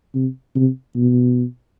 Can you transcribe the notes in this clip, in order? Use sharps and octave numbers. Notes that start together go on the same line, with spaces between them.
C3
C3
B2